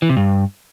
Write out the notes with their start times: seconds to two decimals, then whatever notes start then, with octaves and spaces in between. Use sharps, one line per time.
0.02 E3
0.09 C3
0.17 G2